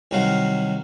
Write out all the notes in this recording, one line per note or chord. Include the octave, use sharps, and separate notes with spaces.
C2 D#3 F#3 F#4 F5 F#5